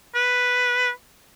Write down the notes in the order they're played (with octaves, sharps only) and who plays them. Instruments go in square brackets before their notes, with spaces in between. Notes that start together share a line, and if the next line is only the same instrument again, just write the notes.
[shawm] B4